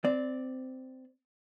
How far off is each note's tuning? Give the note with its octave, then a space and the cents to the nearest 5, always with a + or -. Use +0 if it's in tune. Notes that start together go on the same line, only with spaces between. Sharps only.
C4 -15 D5 +0